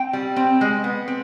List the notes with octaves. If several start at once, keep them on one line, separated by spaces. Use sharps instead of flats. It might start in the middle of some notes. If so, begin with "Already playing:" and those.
Already playing: C4 G5
G3
C4
G#3
B3
C4